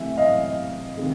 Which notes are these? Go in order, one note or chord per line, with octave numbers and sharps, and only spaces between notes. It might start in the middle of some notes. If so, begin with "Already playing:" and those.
Already playing: C3 E3 A3 E5
D#5 F5
C3 D#3 G#3